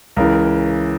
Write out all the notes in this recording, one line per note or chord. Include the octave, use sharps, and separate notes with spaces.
C#2 C#3 E3 A#4